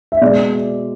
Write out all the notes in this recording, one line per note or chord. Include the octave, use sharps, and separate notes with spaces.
E5
B2 G#3 D5